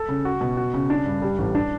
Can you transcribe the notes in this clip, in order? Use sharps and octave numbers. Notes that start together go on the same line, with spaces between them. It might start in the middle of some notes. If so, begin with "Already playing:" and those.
Already playing: A4
C#3
F#4
B2
F#4
C#3
D4
G2
G3
A1
D4